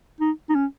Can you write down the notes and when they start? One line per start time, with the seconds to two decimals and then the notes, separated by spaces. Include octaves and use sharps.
0.20 D#4
0.49 D#4
0.55 C#4